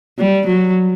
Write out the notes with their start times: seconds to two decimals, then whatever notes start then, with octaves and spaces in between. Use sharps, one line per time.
0.19 G3
0.47 F#3